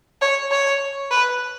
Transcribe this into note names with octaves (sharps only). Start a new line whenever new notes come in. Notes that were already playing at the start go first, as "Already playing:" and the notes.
C#5
C#5
B4